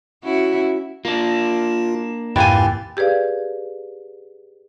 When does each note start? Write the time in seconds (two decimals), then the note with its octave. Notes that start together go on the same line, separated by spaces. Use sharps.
0.24 C#4 E4 F#4
1.05 A#3 D4 F4
2.36 F2 G#2 E3 F4 G4 G#5 A6
2.97 G4 G#4 B4 D5 F5